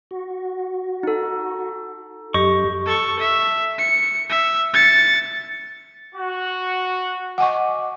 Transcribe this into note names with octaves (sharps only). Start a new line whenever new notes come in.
F#4
D#4 A4
F#2 G4 D#5 C#6
A4 C#6
E5
C#7
E5
A6 C#7
F#4
D#5 F#5 G#5 C#6 D6